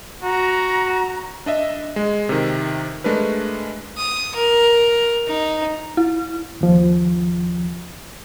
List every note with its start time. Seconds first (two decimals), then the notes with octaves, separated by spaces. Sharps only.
0.23 F#4 A#5
1.46 D4 D#5 E5
1.96 G#3
2.29 C3 D#3
3.04 G#3 A3 D4 A#4 B4
3.97 D#6
4.35 A#4
5.27 D#4
5.97 E4
6.61 D#2 F3